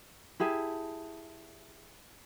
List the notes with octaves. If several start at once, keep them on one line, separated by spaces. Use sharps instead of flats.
E4 G4 G#4 A5